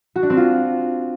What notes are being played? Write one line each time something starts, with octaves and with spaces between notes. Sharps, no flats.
F#4
D4
C4
F4